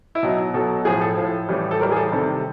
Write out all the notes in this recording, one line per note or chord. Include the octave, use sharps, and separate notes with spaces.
E4
B2 F#3 D#4
B2 F#3 A4
A2 F3 G#4
A4
A2 F3
A2 E3 G3
A4
A2 E3 G3 A#4
G#4
A4
C3 D#3 G3 A4